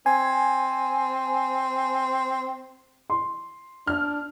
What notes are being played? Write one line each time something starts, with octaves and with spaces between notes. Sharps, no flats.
C4 G#5
C6
D4 F6